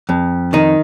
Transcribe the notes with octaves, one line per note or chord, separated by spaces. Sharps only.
F2
D#3 D#4